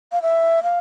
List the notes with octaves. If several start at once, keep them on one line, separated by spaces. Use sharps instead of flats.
F5
E5
F5